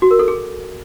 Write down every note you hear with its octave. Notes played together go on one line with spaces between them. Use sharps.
F#4
A#4
A4
G#4